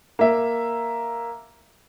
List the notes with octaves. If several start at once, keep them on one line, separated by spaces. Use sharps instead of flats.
A#3 E5